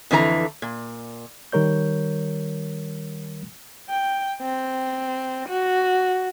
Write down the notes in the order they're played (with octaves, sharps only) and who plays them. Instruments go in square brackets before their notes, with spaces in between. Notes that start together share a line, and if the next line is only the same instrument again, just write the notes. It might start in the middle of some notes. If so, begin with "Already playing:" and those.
[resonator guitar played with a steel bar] F2 D3 E3 D4 A#5
A#2
[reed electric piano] D#3 G3 A#4 C#5 G6
[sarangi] G5
C4
F#4